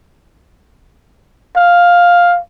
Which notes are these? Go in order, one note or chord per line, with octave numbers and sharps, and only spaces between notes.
F5